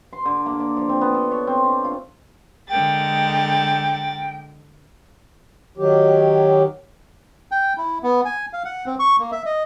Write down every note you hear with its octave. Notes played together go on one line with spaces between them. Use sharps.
C6
D3
A#3
D5
F3
C4
B3
A4
C#5
C4
D4
F4
D3 G#3 A#4 F#5 G5 A6
D#3 F#3 G4
G5
E4
B3
G#5
F5
F#5
C4
C#6
A#3
E5
D#5